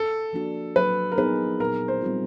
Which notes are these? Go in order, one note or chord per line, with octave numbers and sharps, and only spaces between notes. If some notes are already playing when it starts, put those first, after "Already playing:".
Already playing: A4
F3 A#3 D4 F#4
F#3 B4
A#4
B3 D#4 G#4 B4
A#2 A#4
C5
G3 C4 F4